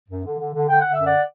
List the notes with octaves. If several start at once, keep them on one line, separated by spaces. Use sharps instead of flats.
F#2
D3
D3
D3
D3 G5
D3 F#5
E5
F#2
D5 F#5